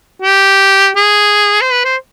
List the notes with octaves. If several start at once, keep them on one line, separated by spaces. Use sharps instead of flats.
G4
G#4
C5
B4
C5